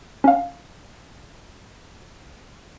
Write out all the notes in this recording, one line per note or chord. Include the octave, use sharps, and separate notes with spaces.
C#4 F5